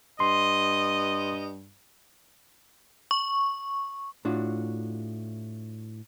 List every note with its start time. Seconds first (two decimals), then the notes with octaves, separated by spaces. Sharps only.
0.20 G2 D#5 C6
3.11 C#6
4.25 A2 D4 F4 F#4